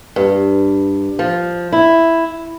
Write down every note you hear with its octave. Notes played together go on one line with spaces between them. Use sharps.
G2
F3
E4